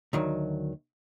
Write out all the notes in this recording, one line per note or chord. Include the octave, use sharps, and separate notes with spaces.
D2 D#3 F#3